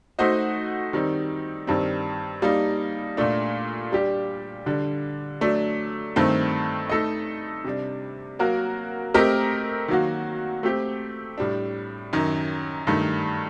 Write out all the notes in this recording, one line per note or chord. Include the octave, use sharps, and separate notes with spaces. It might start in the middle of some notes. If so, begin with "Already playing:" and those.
A3 D#4 F#4 C5 D#5
D#3 G3 C4 D#4
G2 D#3 G3 C4
G3 A#3 D#4
A#2 A3 D4
G3 D4 G4
D3 G3 D4
F#3 A3 D4
G2 D#3 A3 C4
A3 D#4 A4 D#5
C3 G3 D4
F#3 A#3 F#4 A#4
A3 C4 G4 A#4 D#5
D#3 F#3 A#3 F#4
A3 C4 G4
A2 G3 D4
F#2 D#3 F#3
G2 D#3 A3